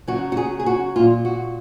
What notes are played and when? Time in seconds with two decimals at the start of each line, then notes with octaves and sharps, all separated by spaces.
0.07 C#3 F#3 F#4
0.32 F#4
0.37 G#4
0.60 G#4
0.66 F#4
0.96 A#2 G#3 F4
1.25 F#4